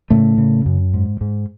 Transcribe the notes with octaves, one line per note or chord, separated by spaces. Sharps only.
A2 C#3 A3
C#3
F#2
G#2
G#2